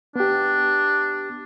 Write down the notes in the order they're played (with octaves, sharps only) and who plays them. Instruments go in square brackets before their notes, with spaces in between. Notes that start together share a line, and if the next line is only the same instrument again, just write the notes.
[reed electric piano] B3 G4 [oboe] D4